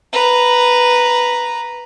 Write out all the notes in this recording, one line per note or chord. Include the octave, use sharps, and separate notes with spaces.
B4 A#5